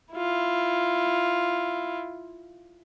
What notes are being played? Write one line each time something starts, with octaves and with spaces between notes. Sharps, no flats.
E4 F4